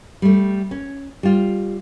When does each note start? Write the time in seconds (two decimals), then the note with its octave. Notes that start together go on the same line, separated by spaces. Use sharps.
0.22 G3 A3
0.71 C#4
1.23 G3 F4